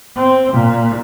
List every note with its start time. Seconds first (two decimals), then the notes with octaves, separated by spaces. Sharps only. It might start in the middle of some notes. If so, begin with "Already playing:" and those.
0.15 C4
0.52 A#2